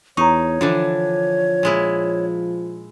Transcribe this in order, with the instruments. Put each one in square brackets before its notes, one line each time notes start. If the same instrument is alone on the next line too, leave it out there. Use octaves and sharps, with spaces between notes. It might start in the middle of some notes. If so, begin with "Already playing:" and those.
[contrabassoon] E2 [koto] D#4 [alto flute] C#5 [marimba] A#5 C#6
[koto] D3 E3 D4 [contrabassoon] F3
[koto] A#2 G#3 E4